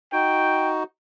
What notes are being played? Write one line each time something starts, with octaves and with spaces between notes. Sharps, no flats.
D#4 F#4 G5